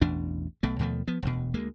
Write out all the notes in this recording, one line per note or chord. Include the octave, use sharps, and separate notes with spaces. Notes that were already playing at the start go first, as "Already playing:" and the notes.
A1 E2 B2 D4
B1 B2 A3
D#2 B2 F3 A3
F3 B3
E1 D2 B2
D2 G#3 A#3